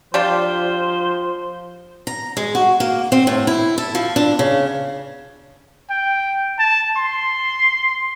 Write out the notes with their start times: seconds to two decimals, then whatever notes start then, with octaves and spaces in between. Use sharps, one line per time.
0.14 F3 G3 D4 F4 C5
2.07 A#5
2.37 G#3
2.55 F#4
2.80 A#3
3.12 C4
3.27 A2
3.47 E4
3.78 A4
3.95 F3
4.16 D4
4.39 C#3
5.90 G5
6.59 A5
6.97 C6